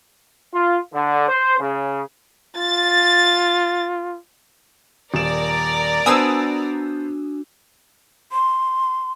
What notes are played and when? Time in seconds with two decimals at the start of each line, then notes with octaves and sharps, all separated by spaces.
0.53 F4
0.93 D3
1.28 C5
1.59 C#3
2.56 F4 A6
5.14 D#1 A#4 D5 A#5 E7
6.06 B3 D4 F#4 C5 G#5 A5 D#6 E6
8.32 C6